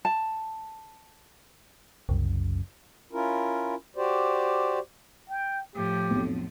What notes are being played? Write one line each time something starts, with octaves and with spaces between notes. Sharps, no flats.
A5
F#1 C2 F#2 C#3
C#4 E4 F4 A#4
F#4 G4 C5 D5
G5
A2 F3 G4
B1 F2